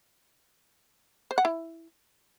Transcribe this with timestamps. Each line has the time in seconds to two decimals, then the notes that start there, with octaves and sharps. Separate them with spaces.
1.31 C5
1.38 F#5
1.45 E4